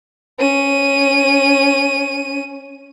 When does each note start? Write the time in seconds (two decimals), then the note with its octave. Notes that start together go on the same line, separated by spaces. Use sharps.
0.39 C#4 D#7